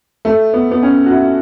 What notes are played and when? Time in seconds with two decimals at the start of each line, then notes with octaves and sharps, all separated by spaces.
0.25 A3
0.54 B3
0.71 B3
0.83 C#4
1.06 F#4
1.11 E4